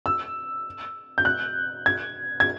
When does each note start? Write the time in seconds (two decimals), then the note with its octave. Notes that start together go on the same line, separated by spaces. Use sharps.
0.06 E6
1.18 G6
1.25 F#6
1.86 G#6
2.40 G#6